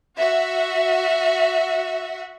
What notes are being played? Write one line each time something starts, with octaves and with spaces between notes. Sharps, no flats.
F#4 E5